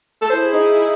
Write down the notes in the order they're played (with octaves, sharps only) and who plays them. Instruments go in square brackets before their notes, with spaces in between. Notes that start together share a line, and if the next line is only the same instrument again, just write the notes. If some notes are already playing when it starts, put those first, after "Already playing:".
[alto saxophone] A4
[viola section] E4 G#4 [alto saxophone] C5
[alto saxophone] D#4